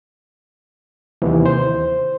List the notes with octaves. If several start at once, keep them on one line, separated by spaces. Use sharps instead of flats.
D#2 C3 D#3 E3
C5